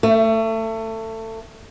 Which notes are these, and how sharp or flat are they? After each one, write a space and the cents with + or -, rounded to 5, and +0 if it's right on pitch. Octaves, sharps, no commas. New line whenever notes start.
A3 +25